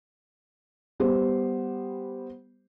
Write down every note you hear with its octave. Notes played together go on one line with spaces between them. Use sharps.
G3 B3 G4 C5